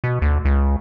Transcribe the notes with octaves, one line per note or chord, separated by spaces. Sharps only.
B2
D2
C#2